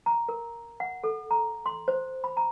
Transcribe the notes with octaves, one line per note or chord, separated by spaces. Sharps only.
A#5
A#4
F#5
A4
A#5
C6
C5
B5
A#5